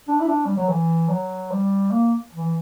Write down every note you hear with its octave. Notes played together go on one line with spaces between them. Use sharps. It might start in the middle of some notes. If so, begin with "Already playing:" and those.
D4
E4
D4
G3
F#3
E3
F#3
G3
A#3
E3